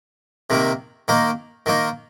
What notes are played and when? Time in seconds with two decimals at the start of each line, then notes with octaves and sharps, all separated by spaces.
0.50 C3 D#3 A#3
1.08 D#3 A#3 D#4
1.66 D#3 A#3 D#4